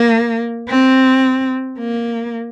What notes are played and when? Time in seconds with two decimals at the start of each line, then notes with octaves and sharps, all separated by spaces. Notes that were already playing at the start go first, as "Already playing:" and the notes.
Already playing: A#3
0.69 C4
1.79 A#3